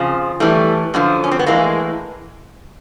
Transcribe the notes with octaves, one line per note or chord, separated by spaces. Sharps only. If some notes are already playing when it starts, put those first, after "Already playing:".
Already playing: F2 C#3 F3
A2 E3 G3 A3
F#2 D3 F3
C#4
C4
B3
A2 E3 G#3 A#3